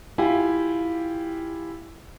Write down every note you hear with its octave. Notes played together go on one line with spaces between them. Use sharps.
E4 F4 G4 F5 G5 G#5